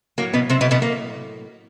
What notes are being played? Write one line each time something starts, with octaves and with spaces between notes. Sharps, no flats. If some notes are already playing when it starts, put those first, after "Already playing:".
A2 F#3 A#3
B2 B3
C3 C4
B2 B3
B2 B3
A#3